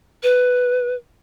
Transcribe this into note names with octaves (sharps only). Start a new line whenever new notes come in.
B4